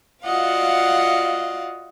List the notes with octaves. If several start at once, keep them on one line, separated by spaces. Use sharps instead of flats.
F4 F#4 D5 D#5 F5 F#5